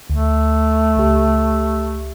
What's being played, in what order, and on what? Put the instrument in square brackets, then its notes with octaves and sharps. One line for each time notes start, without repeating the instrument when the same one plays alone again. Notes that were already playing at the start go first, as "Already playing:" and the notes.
[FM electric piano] D2 [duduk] A3
[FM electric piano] C#2 G4